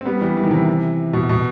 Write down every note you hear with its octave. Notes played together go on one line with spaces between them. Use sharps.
C4
G3 B3
E3 G3
E3
D#3
C3 E3
B2
B2